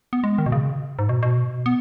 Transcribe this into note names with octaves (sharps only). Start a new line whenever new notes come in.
B3
G#3
D#3
B2
C#3
G#2
B2
B2
B3